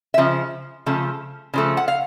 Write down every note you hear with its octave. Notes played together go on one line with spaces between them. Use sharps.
E5
C#3 F3
C#3 F3 A3
C#3 F3 A3
F#5
F5